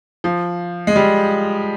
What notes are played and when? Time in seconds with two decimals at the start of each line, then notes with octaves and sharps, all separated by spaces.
0.24 F3
0.87 G#3
0.96 G3